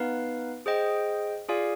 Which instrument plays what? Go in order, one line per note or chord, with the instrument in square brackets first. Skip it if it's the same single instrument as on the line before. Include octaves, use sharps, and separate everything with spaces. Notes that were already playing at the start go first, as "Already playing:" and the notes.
Already playing: [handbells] B3 D#4 B4 F5
G#4 C5 D#5 G5
F4 G#4 D5 F5 G#5